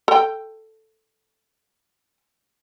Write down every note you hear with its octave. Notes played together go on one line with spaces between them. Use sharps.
A4 G5